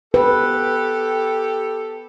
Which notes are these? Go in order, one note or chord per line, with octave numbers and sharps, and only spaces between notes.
G4 A4 B4